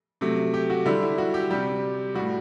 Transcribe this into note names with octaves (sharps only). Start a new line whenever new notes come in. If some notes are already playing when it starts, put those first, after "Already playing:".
C3 F#3 A3
G4
F#4
D3 G3 E4
E4
F#4
G4
C3 G3 G4
A2 G3 F#4